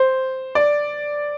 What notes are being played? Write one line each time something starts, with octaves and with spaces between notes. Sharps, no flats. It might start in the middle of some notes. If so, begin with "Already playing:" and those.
Already playing: C5
D5